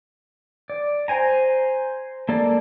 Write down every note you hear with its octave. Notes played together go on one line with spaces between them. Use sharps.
D5
C5 G#5 A#5
A#3 A4 D5